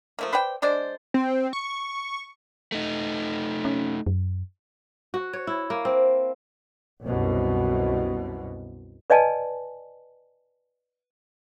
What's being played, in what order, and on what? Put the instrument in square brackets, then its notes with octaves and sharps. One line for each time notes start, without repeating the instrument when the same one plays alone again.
[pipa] F3 A3 A#3
B4 C5 D5 G5
G#3 D4 C5 D5
[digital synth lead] C4
C#6
[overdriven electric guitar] A3 D#4
[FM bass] C#4
F#2
[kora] F#4
C#5
E4
A#3
C4
[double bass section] C2 F#2 B2
[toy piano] B4 D5 D#5 G#5 A5